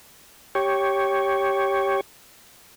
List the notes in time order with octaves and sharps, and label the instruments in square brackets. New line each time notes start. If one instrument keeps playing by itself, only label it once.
[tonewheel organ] G4 C#5